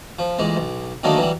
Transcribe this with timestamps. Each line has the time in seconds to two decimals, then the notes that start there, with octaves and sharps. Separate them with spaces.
0.19 F3
0.39 A1 A#2 G#3
0.57 B1
1.03 D3 D#3 F#3 A3 A#3 D#4
1.17 E3 F#3 G3